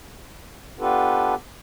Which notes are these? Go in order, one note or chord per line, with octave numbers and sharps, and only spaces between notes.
B3 D4 F4 G4 A4 B4